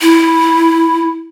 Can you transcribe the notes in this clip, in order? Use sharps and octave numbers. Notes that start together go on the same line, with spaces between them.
E4